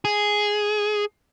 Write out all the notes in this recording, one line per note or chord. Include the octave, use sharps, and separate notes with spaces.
G#4